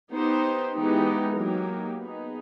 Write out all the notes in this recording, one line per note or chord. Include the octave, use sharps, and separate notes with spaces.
B3 D#4 G4 C5
E3 G#3 B3 D#4 G4
F#3 A#3 D#4 G4 A#4
B3 D#4 G#4